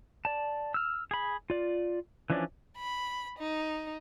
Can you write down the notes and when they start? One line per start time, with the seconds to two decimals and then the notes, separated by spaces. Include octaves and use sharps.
0.25 D5 A5
0.74 E6 F6
1.11 G#4 B5
1.50 F4 D5
2.30 E3 F3 C#4 D4 D5
2.78 B5
3.39 D#4